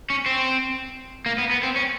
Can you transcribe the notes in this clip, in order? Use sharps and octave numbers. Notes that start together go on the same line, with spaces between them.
C#4
C4
A#3
B3
B3
C4
C#4